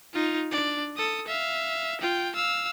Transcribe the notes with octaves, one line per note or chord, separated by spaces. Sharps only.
D#4 F4
D4 D5
A4 D#6
E5 F5
F4 G5
F5 E6